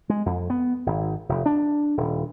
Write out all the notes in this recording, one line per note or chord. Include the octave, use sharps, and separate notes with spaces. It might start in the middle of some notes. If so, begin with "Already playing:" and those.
G#3
F2
B3
G#1
F1
D4
D#1